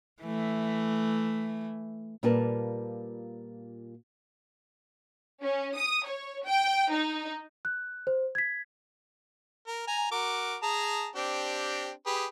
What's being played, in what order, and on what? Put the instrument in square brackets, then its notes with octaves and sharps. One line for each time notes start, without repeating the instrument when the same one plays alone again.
[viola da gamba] E3 A3
[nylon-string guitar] A#2 G3 F4 A#4 B4 A5
[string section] C#4
D#6
C#5
G5
D#4
[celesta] F#6
C5
G#6 B6
[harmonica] A#4
G#5 A#5
F#4 A#4 D6
G#4 A5 A#5
C4 D4 G4
G4 G#4 B4